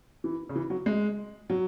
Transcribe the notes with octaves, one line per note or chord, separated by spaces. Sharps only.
E3
C#3
E3
F#3
G#3
F#3